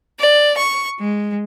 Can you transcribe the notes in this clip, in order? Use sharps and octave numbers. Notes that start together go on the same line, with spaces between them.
D5
C#6
G#3